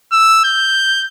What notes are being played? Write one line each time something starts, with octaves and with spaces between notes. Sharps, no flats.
E6
G6